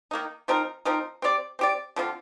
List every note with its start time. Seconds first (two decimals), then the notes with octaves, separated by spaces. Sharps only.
0.11 D#3 A#3 D#4
0.48 F3 C4 D#4 A#4
0.85 F3 C4 D#4 A#4
1.22 C4 G4 D5
1.59 C4 G4 D5
1.96 D3 F3 C4 F4